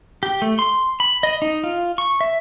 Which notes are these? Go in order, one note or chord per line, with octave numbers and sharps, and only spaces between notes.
G4
A3
C6
B5
D#5
D#4
F4
C#6
E5